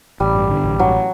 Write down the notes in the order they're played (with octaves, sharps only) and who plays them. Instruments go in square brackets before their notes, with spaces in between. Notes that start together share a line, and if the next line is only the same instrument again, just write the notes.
[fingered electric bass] A1 [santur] G3
[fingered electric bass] G2
D3
A1
[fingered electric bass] G2 [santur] F#3